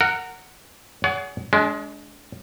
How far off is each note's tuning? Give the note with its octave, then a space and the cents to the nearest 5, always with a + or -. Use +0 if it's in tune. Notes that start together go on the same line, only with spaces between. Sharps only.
A#4 -20 F#5 +0
G#4 +10 C#5 +45 F#5 +15
G#3 +20 D4 -25